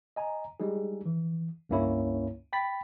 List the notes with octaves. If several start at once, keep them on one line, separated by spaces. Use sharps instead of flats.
D#5 G#5 A#5
G3 G#3 D#4 G#4
E3
C#2 G2 A#3 C#4 E4 C#5
G5 B5 A6 B6